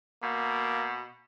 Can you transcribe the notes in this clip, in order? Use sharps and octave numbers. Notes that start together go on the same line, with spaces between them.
B2 A#3